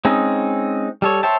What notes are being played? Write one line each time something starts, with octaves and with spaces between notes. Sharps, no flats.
G#3 C4 C#4 D#4
G3 A4 C#5
C5 C#5 E5 G5 A5